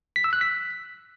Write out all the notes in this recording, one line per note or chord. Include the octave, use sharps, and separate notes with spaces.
B6
E6
F#6
B6